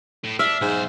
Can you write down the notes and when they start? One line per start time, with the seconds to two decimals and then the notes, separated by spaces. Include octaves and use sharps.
0.24 A2
0.39 D4 E5 F6
0.61 B1 G#2 C5